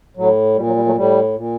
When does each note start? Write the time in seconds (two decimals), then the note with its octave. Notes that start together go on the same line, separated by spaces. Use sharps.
0.17 A2 F#3
0.56 A#2 G3
0.67 F#3
0.75 G3
0.86 F#3 A3
0.96 A2 G3
1.35 A#2